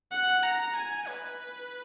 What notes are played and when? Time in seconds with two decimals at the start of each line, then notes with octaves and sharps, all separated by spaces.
0.11 F#5
0.43 A#5
0.76 G#5
1.08 B4